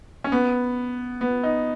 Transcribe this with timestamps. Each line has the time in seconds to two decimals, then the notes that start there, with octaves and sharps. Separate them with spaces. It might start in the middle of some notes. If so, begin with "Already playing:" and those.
0.24 C#4
0.32 B3
1.21 B3
1.43 D#4